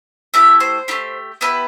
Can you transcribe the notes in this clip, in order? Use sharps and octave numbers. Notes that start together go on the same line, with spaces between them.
A3 E4 G4 E5
C5
A3 E4 G4
B3 E4 G4 B4